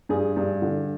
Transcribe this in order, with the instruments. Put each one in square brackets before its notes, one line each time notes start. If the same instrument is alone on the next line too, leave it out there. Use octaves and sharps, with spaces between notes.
[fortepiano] G2 G#4
G2
D3